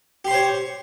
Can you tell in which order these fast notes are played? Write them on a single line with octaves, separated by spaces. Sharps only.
G4 C6 C5 C#5